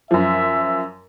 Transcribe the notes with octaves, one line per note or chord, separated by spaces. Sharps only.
F#2 F3 E5